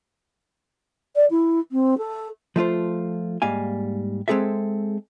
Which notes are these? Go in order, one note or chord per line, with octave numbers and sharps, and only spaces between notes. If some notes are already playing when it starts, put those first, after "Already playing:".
D5
E4
C4
A4
F3 A3 F4 C5
G#2 G3 A#3 F5 G#5
G#3 C4 G#4 A4 E5